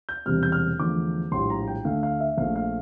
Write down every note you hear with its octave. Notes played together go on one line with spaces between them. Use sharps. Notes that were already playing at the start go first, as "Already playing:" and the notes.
G6
E1 E2 C3 G3 F6
G6
F6
E2 D3 F3 A3 D6
A#1 A2 G3 C6
A#5
G5
D2 D3 A3 F5
F5
E5
A#1 A#2 A3 F5
F5